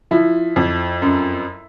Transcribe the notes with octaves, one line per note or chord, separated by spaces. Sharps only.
F3 E4
F2
F#2